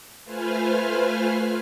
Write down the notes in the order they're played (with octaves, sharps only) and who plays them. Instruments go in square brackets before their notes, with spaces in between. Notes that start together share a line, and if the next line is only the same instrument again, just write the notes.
[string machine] A3 F4 B4 C5 G#5 F6